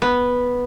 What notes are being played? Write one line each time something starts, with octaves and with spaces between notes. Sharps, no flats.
B3